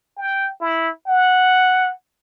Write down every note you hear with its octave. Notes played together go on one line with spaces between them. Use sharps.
G5
E4
F#5